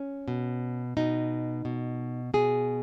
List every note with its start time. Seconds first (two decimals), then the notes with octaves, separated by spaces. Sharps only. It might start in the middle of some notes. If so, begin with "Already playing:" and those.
Already playing: C#4
0.28 B2
0.97 B2 D#4
1.65 B2
2.34 B2 G#4